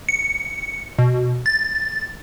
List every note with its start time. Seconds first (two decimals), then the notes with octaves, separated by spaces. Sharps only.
0.09 C#7
0.99 B2
1.46 A6